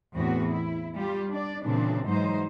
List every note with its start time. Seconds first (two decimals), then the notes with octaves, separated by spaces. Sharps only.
0.14 E2 A2 B3 C4 F#4
0.50 E4
0.95 G3 F4 G4
1.31 D4 D5
1.64 A#2 C#3 E3 C4 D4
2.05 G#2 E3 F#3 D#4 C5